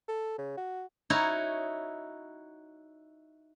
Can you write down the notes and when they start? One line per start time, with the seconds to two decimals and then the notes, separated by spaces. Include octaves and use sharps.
0.08 A4
0.38 C#3
0.57 F#4
1.10 D#4 E4 F#4 C#5